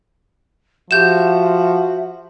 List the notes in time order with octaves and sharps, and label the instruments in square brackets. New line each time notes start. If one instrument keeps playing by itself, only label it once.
[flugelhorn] F3 [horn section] F#4 [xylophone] G4 G6 E7 [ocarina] E5